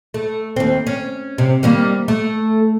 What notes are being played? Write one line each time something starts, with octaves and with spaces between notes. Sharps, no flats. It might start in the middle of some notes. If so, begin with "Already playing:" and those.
A3
D#2 C4
C#4
C3
D#3 G3 A#3
A3